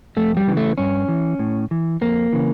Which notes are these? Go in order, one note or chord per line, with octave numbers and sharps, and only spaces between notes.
F2 A3
G3
C#3 E3
A3
G2 C#4
E3
A2
E3
F2 A#3
C#3 E3